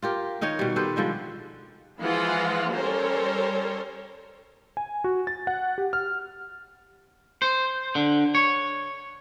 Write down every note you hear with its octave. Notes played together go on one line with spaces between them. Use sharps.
F4 G4 A#4
D#3 D#4 A#4 C#5
B2 G3
G4 A4 B4 C5
D3 F3 G3 G#3
E3 F3 G#3 F4 G#4 F#5
G3 C#4 A4 A#4 C5 C#5
G#5
F#4
A6
F#5
G4
F6
C5
D3
C#5